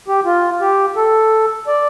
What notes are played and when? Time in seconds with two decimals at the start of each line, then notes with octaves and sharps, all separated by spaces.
0.08 G4
0.25 F4
0.61 G4
0.96 A4
1.67 D5